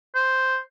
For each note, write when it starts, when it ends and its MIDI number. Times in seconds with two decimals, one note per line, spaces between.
0.15 0.58 72